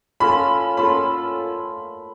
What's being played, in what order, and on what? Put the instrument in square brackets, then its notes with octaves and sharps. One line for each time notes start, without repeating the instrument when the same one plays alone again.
[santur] C#4 F4 A4 [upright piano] B5
[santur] C#4 F4 A4 [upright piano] B5